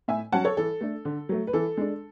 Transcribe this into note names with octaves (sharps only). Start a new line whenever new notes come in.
A2 E5 G#5
F#3 C#4 F#5 A5
A4 C#5
E3 A4
A3 D4
D3
F#3 A3
B4
E3 A4
G#3 D4